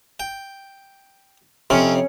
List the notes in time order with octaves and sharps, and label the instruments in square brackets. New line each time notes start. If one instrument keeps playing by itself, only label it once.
[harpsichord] G5
[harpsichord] F2 C3 C4 [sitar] C#4